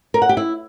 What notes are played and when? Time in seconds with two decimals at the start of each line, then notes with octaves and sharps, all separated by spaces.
0.14 A#4
0.22 F#5
0.29 G4
0.37 E4